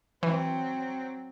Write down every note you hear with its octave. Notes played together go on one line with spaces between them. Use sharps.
E3 F#3 C4